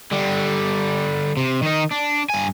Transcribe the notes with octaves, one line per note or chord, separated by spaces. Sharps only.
D3 G3
C3
D#3 D#4
D4
G2 G#5